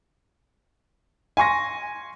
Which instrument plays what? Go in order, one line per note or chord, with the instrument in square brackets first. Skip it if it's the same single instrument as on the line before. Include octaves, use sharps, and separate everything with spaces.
[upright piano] G#5 C6 C#6 A#6